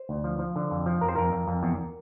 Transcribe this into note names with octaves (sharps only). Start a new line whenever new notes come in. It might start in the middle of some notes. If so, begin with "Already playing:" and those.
Already playing: C5
D2
F3
F3
D3
F2
F3
F2 A#4
C5
F2 A#4
F2
F2
E2